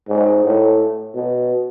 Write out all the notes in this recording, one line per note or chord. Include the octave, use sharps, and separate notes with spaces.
G#2
A2
B2